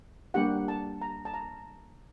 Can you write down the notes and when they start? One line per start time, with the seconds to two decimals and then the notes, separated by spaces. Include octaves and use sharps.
0.34 G3 A#3 D4 G4 F#5
0.68 A5
1.01 A#5
1.25 A5
1.34 A#5